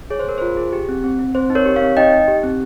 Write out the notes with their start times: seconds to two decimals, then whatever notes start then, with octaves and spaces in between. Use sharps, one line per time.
0.10 G#4 C#5
0.20 C5
0.26 G#4 A#4
0.38 F4 C5
0.57 G#4
0.73 G4
0.89 C4
1.04 C4
1.19 C4
1.35 C4 C5
1.50 D#4
1.55 A#4 C#5
1.66 G4
1.76 C#5 F5
1.81 C4
1.97 D#4 D#5 G5
2.13 D#4
2.28 G4
2.43 C4